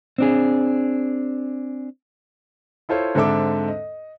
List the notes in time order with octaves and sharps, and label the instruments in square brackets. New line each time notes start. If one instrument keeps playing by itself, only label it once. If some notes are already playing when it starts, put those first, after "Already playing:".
[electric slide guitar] C4 D4 G#4
[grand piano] E4 F4 A4 C5 C#5
G#2 D3 C4 A4 E5 D6
D#5